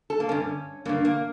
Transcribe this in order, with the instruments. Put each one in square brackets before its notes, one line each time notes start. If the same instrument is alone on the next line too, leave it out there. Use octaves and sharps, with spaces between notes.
[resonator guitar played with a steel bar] A4
A#3
G2 D3 C#4
G2 D3 A#3
A#3